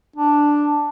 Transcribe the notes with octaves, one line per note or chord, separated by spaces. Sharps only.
D4